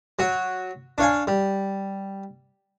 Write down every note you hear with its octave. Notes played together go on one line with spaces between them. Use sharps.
F#3 F#4 C#5
D4 C#5 F5 G#5
G3